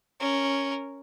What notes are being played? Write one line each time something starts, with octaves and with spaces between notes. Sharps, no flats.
C#4 A#4